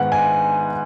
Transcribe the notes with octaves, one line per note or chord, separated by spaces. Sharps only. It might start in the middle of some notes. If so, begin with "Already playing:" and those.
Already playing: G#2 D#3 B3 D#4 F#5
G#5